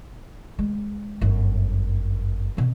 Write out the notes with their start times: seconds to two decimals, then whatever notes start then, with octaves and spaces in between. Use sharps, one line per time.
0.59 G#3
1.21 G1 F#2
2.57 B2 C4